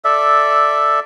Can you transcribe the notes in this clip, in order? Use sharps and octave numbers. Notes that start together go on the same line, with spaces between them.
A4 D5 E5